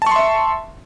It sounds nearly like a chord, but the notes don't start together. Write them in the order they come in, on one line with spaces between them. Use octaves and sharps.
A5 C#6 C6 E5